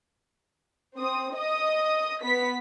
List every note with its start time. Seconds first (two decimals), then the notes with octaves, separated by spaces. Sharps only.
0.98 C4 D#6
1.36 D#5 D#6
2.22 B3 B6